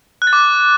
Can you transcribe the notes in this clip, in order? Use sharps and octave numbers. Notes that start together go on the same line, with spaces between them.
F#6
A6
D6